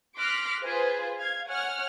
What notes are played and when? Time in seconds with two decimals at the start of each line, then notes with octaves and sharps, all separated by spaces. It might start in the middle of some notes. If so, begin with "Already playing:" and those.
0.18 C6 D6 F6 F#6 A#6 B6
0.61 F4 G#4 B4 C5
1.18 F5 G#6
1.48 C#5 F#5 G#5 F6